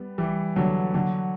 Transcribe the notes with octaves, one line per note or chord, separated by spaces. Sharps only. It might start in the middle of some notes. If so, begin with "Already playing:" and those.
Already playing: G3 B3
E3 G3
D3 F#3
D3 F#3